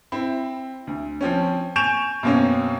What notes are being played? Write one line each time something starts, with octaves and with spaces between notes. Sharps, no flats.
C4 E4
D2
F3 C4 C#4
G#5 C#6 G6 D7 E7 F7
F#2 B2 A#3 C4 C#4